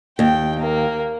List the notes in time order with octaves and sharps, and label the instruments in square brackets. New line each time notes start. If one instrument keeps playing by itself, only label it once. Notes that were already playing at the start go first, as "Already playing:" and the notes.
[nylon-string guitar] D#2 [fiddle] G5
[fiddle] A#3